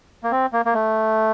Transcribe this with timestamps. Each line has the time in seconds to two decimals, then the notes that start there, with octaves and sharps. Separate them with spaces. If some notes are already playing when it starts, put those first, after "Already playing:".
0.23 A#3
0.31 C4
0.53 A#3
0.65 A#3
0.74 A3